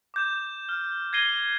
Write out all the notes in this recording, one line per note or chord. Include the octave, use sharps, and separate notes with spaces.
D6 G6 E7
F6
G#6 A#6 C7 D#7 G7